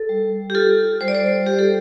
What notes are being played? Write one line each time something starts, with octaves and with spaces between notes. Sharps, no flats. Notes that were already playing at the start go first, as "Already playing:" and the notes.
Already playing: A4
G3
G4
F4 A4
G3 C5
D5
C5
G3 G4
A4